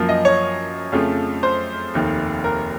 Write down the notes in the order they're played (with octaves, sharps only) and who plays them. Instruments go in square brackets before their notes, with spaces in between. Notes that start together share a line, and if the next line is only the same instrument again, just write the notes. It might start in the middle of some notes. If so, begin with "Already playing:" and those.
Already playing: [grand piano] F#2 F3 A#3
D#5
C#5
F2 C#3 F3 A3
C5
F1 D#2 D#3
A#4